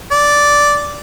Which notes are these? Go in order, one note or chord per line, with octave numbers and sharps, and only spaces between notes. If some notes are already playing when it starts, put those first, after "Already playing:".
D5